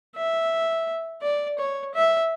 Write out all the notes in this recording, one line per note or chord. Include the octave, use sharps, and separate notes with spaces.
E5
D5
C#5
E5